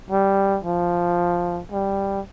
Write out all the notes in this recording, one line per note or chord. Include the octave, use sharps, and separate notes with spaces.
G3
F3
G3